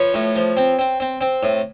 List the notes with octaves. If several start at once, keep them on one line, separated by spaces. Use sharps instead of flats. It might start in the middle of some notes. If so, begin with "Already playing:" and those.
Already playing: F3 B4 C#5
A2
F3
C4
C4
C4
C4
A2